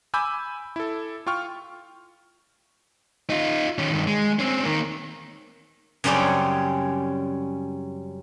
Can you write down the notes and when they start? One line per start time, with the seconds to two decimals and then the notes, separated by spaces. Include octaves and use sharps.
0.14 G#5 B5 D6 E6 G6
0.76 E4 A4
1.27 F4 G5 C#6 F6
3.30 D#4 F4
3.78 D#3 C#4
3.92 G2 D#3
4.07 G#3
4.39 C4 C#4
4.65 D#3 A#3
6.04 F#2 C#3 G3 C4 C#4 D5